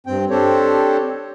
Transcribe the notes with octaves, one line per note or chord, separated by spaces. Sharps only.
G2 C4 G5
C4 D4 G4 A4 C5 C#5